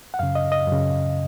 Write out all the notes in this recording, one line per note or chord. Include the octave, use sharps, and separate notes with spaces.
F#5
F#2 C#3 F5
D#5
D#5
F#2
C#3